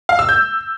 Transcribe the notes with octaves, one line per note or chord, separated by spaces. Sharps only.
F5
E6
G6